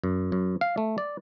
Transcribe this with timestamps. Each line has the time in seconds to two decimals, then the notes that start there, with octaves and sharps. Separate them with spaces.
0.04 F#2
0.32 F#2
0.61 F5
0.78 A3
0.98 D5